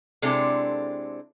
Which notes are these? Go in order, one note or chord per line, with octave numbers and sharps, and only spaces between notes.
C3 G#3 C4 D4 E4 A4